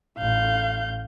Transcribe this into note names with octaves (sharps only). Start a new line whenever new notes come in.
A1 F5 G6